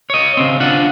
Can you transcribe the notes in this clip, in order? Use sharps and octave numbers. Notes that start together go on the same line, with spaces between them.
C#5 D#5
C#3 C4
D4 F4 F#5